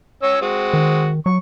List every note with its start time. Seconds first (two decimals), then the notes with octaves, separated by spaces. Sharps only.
0.23 C#4 C#5 E6
0.41 G#3 C4 F#4
0.73 D#3
1.26 F#3 C#6